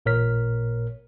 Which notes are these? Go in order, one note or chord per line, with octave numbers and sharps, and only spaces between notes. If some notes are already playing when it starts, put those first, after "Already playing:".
A1 A#2 A#4 C#5 F6 B6